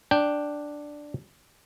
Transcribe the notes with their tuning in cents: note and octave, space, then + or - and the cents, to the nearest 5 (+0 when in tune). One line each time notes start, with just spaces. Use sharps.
D4 +0 G5 +0